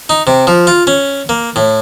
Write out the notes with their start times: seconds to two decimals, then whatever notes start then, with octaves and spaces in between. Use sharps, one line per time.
0.09 D#4
0.27 C3
0.47 F3
0.67 F4
0.87 C#4
1.29 A#3
1.56 A2